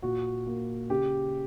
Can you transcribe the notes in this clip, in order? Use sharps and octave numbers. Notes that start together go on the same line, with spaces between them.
A#2 F#4
A#3
C#3 G4